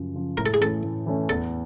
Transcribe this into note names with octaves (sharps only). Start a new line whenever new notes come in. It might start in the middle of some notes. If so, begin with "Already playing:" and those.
Already playing: F#2 C#3 F3
C#3 F3
A2 A#4
A4
G#4
E3 A3 C#4 A4
A2
E3 A3 C#4
E2 A4